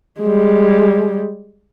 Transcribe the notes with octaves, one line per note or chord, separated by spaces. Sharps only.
G3 G#3